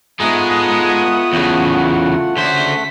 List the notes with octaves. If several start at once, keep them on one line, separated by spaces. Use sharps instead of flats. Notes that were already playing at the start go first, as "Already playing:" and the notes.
G#3 A3 B3 D#4 F4 F#5 D#6
E2 C#3
D2 C#3 C5 B6